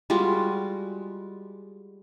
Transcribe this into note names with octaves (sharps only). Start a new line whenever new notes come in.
G3 G#3 F4 F#4